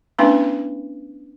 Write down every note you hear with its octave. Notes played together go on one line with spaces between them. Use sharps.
A3 B3 C#4 D4 E4 B4